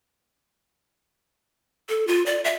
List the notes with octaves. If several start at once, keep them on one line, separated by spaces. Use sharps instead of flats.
A4
F4
D5
E5